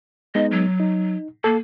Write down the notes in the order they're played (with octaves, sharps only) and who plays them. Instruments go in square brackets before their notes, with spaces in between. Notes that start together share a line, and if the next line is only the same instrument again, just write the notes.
[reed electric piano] G#3 B3 D#4 [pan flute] D#5
[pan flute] F#3
[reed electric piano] D#4
[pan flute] A#3 [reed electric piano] A4